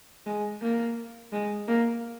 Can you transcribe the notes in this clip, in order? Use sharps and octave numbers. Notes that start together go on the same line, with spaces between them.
G#3
A#3
G#3
A#3